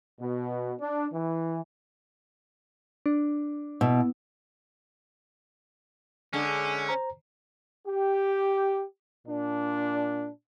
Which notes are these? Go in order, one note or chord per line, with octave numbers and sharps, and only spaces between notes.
B2
D4
E3
D4
B2 E4
D3 G#3 C#4
C5 A#5
G4
A#2 D4